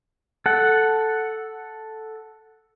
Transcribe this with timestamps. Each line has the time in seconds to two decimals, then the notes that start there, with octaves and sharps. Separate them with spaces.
0.46 A4 F#5